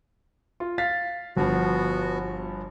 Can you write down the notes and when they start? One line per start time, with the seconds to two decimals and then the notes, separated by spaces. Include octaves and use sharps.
0.60 F4
0.78 F5 A6 B6
1.37 G1 F3 B3 F#4